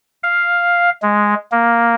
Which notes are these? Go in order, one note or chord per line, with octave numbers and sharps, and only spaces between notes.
F5
G#3
A#3